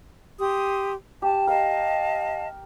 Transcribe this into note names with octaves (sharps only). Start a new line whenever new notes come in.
G4 C6 D#6
G4 A5
A#4 D#5 F5 A5